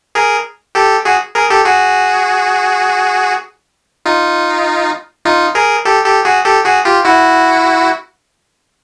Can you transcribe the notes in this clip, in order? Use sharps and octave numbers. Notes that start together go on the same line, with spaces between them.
G#4 A#4
G4 A4
F#4 G#4
G#4 A#4
G4 A4
F#4 G#4
D#4 F4
D#4 F4
G#4 A#4
G4 A4
G4 A4
F#4 G#4
G4 A4
F#4 G#4
F4 G4
E4 F#4